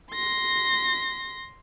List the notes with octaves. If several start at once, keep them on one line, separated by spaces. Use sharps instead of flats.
C6 A#6